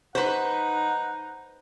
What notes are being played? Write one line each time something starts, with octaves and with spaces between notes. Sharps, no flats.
D#4 B4 C5 F#5